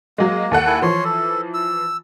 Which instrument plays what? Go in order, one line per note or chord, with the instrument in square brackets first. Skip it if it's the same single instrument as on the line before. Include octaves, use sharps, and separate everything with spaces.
[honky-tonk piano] F#3 G#3 [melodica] A#3
[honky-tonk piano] D#2 A4 F#5
[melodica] E4 G#5
[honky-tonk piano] E3 F3 [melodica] C#5 C6
[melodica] A4
E6